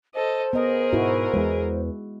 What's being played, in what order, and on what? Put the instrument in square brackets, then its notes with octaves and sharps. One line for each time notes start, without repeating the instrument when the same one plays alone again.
[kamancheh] A4 D#5 [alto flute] C5
[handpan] B3 D#5 [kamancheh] G#4 A#4
[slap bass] G#2 B2 [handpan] E4 F#4
[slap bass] E2 E3 [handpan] G#3